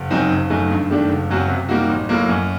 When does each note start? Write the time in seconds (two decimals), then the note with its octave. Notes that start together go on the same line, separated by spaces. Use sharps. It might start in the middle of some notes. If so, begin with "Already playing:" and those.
Already playing: F#1
0.10 F#2 F#3 C4 D#4
0.30 F#1
0.50 F#2 F#3 A3 D#4
0.71 G2
0.90 D#3 A3 D4 G4
1.09 F#1
1.30 F#2 F#3 C4 F#4
1.49 C3
1.69 G3 A#3 D#4 F#4
1.89 A1
2.09 A2 F#3 A#3
2.29 F#2